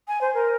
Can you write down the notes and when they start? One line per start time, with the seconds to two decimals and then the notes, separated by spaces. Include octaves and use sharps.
0.07 G#5
0.21 C5
0.34 A#4